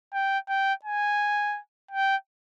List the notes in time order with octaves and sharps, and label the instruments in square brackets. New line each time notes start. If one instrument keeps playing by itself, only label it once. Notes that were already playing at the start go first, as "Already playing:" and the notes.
[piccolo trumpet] G5
G5
G#5
G5